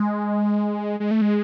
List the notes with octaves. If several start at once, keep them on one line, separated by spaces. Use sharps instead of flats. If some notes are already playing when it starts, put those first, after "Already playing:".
Already playing: G#3
G#3
A3
G#3